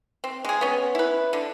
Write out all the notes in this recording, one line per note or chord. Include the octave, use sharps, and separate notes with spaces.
C4
G#3 G#4
B3 C#4
E4 B4
D3